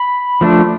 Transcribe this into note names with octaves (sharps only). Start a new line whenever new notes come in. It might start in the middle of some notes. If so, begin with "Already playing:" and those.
Already playing: B5
F3 A3 D4